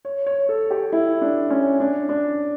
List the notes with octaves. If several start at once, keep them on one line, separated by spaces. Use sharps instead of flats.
C#5
C#5
A4
G4
E4
D4
C#4
D4
D4